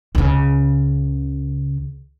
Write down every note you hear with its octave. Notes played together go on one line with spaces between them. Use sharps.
C#2 C#3